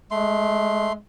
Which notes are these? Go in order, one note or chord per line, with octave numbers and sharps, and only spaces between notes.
G#3 A3 C6